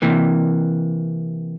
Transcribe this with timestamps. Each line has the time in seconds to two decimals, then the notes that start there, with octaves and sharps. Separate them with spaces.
0.02 C3 E3 A#3